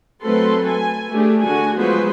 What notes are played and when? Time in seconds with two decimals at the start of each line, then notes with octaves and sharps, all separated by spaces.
0.23 F#3 A3 C4 A4 B4 C6
0.67 G#5
1.11 A3 D4 G4 G#4
1.43 D3 F#4 G#5
1.78 F3 F#3 G#3 B3 B4 C5